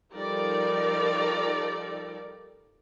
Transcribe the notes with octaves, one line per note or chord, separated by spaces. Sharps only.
F3 G3 D#4 A4 A#4 D5